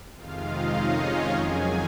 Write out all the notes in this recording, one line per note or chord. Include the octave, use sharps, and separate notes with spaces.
F2 C3 D#3 G#3 F4 F5
D#4 D#5
C#4 C#5
F4 F5
F2 D#3 F#3 G#4 G#5
G#4